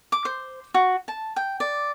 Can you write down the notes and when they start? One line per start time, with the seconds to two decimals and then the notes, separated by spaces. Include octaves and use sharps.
0.12 D6
0.25 C5
0.74 F#4
1.08 A5
1.36 G5
1.60 D5